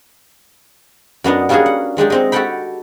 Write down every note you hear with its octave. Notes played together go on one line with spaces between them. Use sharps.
F#2 B3 D4 D#4
G3 A#3 C#4 D4 F#4 G#4
F#5
F#3 G#3 D4 G4
G#3 C4 D#4
F#4 G4 A4 F#5 G5 B5